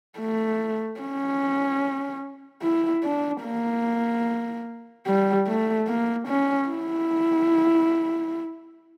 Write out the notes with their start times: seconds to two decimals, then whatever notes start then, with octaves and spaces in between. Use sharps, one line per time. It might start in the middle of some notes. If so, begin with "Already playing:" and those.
0.19 A3
1.00 C#4
2.62 E4
3.03 D4
3.43 A#3
5.06 G3
5.47 A3
5.87 A#3
6.28 C#4
6.69 E4